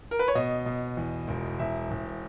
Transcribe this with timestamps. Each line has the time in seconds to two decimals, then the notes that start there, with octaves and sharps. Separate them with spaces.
0.11 A#4
0.19 B4
0.28 C#5
0.35 B2 D#5
0.66 B2
0.97 E2
1.28 E1
1.59 E1 E5
1.91 E1